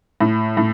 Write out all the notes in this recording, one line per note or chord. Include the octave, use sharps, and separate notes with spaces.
A2
A2